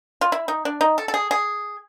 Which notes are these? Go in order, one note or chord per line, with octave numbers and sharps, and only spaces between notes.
F4
E4
D#4
D4
D#4
A4
A4
G#4
G#4